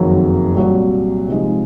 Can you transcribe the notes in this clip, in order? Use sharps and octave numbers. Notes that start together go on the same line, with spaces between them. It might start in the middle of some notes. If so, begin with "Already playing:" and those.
Already playing: F#1 F2 D#3 F#3
C2 A#2 F#3
C3 F3 G#3 D#4